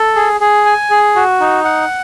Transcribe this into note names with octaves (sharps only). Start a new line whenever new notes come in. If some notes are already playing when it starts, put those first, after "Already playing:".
Already playing: A4
G#4
G#4
G#5
G#4
F#4
D#4
F#5